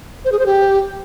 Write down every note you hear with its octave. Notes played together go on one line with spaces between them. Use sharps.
C5
G#4
C5
G4